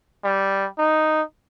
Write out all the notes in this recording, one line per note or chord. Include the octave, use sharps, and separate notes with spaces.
G3
D#4